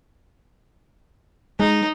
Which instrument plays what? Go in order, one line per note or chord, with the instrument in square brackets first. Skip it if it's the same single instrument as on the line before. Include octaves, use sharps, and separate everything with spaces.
[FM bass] G#3 [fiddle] D#4